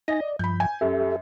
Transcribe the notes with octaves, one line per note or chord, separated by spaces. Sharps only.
D#4 D#5 G#5 A#6
D5
G2 F3 B5 G6
G#5
F#2 G4 A4 E5